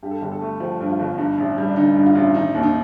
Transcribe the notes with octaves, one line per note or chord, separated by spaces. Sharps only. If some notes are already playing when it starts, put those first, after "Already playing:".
G2 G4
A4
G1 G4
A4
A3
F3 G4
G2
F4
G1
G2 D#4
A1
G3
D4
D3 D#4
G2
F4
A1
D#3 D#4
D#2
D#4